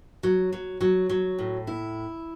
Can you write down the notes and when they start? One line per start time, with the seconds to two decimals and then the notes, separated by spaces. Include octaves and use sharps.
0.23 F#3
0.52 F#3
0.81 F#3
1.09 F#3
1.39 A2
1.67 E4